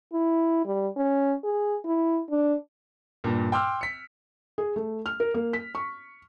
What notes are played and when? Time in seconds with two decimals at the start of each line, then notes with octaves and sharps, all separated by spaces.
0.13 E4
0.65 G3
0.96 C#4
1.44 G#4
1.85 E4
2.30 D4
3.24 G2 A#2
3.52 G5 C6 D6 E6 F6
3.81 B6 C#7
4.58 G#4
4.76 A3
5.06 F6
5.20 A#4
5.34 A#3
5.53 B6
5.75 C#6